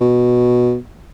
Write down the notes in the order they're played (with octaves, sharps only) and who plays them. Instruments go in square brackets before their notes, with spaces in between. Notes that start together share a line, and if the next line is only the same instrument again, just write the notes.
[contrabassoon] B2